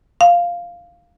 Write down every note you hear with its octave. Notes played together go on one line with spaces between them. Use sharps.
F5